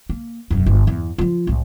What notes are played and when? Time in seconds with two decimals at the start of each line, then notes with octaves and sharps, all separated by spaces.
0.09 A#3
0.51 E1 F#2
0.66 G1
0.87 E2
1.18 F3 F4
1.47 C2 A2